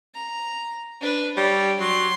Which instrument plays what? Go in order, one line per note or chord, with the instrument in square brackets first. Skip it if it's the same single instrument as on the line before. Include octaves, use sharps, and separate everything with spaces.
[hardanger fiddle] A#5
D4 B4
[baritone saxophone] G3 [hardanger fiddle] C#5
[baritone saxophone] F#3 [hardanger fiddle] C6